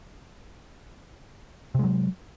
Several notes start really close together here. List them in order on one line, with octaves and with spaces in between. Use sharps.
C3 G#3 F#3